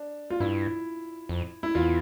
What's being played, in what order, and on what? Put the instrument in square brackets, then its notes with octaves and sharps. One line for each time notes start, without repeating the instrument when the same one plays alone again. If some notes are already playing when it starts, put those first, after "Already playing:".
Already playing: [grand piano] D4
F4
[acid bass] G2 [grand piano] E4
[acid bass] F2
[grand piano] E4
[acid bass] E2 [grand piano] F4